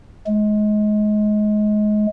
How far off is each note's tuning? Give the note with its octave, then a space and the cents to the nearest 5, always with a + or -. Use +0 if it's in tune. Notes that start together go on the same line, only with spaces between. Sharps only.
G#3 +25